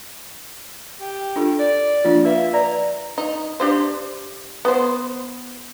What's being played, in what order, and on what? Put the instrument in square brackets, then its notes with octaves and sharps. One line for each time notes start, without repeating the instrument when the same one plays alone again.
[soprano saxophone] G4
[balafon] D4 F4 A4
[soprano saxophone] D5
[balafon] F3 A#3 D4 [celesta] F4
[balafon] B4 F5 [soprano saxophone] E5
[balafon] B4 [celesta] D5 [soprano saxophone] A#5
[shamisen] D#4
D4 G4 C5
B3 C5